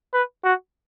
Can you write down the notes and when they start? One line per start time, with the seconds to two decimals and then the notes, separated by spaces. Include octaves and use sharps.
0.14 B4
0.44 F#4